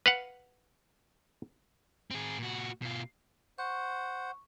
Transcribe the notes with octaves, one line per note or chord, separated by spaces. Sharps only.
B4 F5 F#5
C4 G#4
A#2 F#4
B2 F4
C5 F#5 C#6